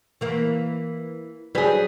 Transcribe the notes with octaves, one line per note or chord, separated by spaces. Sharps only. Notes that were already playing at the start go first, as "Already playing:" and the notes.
E3 A#3
F#3 G3 G#4 B4